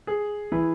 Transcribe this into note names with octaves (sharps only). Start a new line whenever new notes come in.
G#4
E3